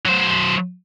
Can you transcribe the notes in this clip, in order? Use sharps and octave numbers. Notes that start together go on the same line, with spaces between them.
F#3 C5